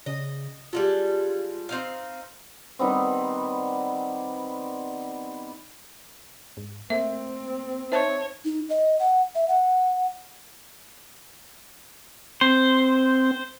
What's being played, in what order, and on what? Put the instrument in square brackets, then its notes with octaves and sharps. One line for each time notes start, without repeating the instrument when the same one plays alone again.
[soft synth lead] C#3 [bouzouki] D#5
[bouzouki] G3 G#3 A4 [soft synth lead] F4
[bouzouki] C4 D#4 F5
[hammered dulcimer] D#3 G3 B3 C4
[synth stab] G#2
[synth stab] A3 A#3 [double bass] C4 [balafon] E5
[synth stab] D#4 C5 A5 [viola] C#5 [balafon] E5
[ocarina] D#4
D#5
F#5
E5
F#5
[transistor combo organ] C4 [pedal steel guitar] C5